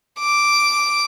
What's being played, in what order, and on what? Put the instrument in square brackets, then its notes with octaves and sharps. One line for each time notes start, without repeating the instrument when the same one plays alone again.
[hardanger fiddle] D6